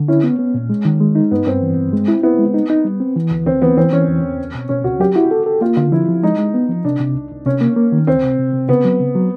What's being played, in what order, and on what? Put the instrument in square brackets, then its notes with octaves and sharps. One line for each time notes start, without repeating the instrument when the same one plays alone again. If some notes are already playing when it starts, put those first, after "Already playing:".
Already playing: [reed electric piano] D3
[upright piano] C#4 [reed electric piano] E4
[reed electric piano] B3
B3
A#2
G#3
D#3
G#3
D#4
[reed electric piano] G2 [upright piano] B3
[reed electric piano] G2 [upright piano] C4
[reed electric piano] E3
G2
G#3
E4
[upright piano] B3 [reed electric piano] E4
[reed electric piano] G#3
D#4
D#4
G3
C4
E3
D2
[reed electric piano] D2 [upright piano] C4
[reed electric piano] E3 [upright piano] B3
[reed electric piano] E3 [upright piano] C4
[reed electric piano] E3 [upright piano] C#4
[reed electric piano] E2
E2
C#2
B2
[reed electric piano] B2 [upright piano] C#4
[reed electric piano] C#2 [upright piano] F#4
[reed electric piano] F#3 [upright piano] G4
[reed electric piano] E4 [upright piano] F#4
[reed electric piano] A4
A4
[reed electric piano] A#3 [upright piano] F4
[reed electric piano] D3 [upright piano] F4
[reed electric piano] F3 [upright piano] E4
[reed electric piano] F3
[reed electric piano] G#3 [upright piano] D#4
[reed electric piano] G#3
B3
F3
[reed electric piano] C3 [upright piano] D4
[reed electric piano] C3
C2
C2
[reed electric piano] C3 [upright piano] C#4
[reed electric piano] A#3
A#3
D#3
[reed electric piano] C#2 [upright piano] C4
[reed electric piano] C3
C3
C3
[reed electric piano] C#3 [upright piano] B3
[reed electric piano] F#3
C#3
F#3